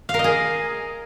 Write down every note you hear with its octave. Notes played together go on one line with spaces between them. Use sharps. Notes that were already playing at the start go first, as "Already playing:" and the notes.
F5
A#4
D#5
G#4